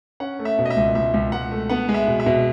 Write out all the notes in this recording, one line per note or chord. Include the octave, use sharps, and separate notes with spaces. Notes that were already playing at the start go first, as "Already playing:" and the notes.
C#4 F#5
A3
E5
B2
D#5
E5
C#2
C#2 E5
C#2
C#2 F#5
A3
B3 F#5
G#3
E5
B2
E5
B2